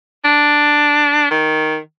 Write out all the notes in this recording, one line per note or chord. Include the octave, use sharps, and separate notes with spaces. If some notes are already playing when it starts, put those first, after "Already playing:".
D4
D#3